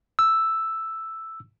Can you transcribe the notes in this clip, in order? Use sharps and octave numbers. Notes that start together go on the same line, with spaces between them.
E6